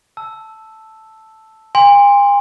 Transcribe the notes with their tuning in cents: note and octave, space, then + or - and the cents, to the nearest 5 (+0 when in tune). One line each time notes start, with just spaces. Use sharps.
A5 +0 E6 +0
G#5 -45 C6 +0